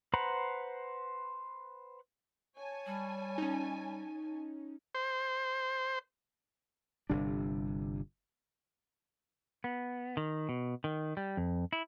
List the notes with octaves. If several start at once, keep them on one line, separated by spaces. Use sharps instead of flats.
B4 C5 F#5 A#5 B5
C#5 G#5 A5
G3
C#4 D#4
C5
G1 C3 G3 D4
B3
D#3
B2
D#3
G3
F2
E4